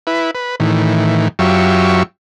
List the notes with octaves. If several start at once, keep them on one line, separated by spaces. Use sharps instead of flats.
E4 B4
B4
A2 D#3 E3
F#2 F#3 F4 G4 E5 C#6